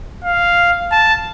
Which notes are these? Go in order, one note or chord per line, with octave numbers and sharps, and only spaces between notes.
F5
A5